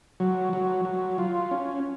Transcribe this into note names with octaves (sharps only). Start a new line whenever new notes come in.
F#3
F#3
F#3
F4
C#4